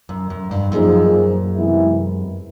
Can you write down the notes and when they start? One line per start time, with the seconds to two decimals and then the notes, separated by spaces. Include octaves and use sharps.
0.09 F#2
0.30 F#2
0.51 G2
0.72 F#2 A#2 F3 A#3 D#4 G#4
1.55 C3 E3 G#3 B3 E4